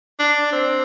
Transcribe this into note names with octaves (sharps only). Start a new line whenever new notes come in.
D4
C4